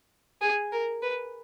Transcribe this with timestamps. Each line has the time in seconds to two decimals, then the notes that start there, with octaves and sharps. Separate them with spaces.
0.41 G#4
0.72 A#4
1.02 B4